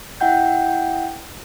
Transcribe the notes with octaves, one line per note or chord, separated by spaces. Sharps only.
E4 E5 F#5 G5 G6